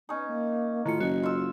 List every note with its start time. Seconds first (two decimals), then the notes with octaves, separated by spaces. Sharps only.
0.09 B3 C#4 D#4
0.28 A#3
0.86 A2 D#3 F4 C#7
1.00 F#1 F#4 D#5
1.23 F4 E6